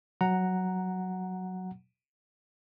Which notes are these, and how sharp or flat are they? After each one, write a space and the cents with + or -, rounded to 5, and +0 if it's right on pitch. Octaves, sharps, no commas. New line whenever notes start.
F#3 +0 F#5 +0 A#5 +0